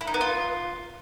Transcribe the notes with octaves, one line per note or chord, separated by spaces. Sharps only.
E4
D#4
B3
F4